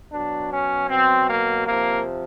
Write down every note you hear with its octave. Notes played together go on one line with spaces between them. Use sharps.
B2 F#3 D4
C#4
B2 F#3 C4
A#3
C3 F3 A#3